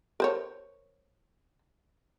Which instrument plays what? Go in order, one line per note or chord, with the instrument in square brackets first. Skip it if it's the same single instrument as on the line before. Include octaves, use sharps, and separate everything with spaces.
[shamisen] A#4 C5 C#5